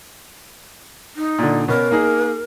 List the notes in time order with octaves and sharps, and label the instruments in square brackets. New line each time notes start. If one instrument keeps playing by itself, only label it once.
[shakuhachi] D#4
[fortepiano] A#2 D3
[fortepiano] B2 B3 C#4 [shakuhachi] A#4
[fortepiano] A#3 D#4 G#4